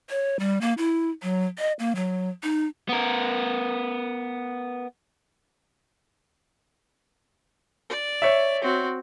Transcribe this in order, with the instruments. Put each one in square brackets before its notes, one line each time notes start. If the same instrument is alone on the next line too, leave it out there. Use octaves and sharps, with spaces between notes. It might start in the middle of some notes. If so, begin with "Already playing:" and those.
[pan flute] C#5
G3
A#3
E4
F#3
D#5
A#3
F#3
D#4
[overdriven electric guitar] B3 A#4
[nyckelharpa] D5
[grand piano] C#5 E5
[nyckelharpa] C4 F#4